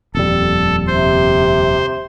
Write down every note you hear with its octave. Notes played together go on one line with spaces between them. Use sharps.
D#1 F2 G3 A4
C3 C5